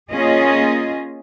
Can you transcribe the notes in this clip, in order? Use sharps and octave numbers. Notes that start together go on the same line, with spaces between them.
A#3 C#4 F4 G#4 D#5